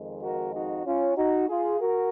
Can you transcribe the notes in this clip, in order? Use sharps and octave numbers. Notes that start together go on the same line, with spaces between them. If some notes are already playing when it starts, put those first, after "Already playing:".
Already playing: F2 D#3 G#3
F#4 A#4
D#4 F#4
C#4 F4
D#4 F#4
F4 G#4
F#4 A#4